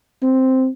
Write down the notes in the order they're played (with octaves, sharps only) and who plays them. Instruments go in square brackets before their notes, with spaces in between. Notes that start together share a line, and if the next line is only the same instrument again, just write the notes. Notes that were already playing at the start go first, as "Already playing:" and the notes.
[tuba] C4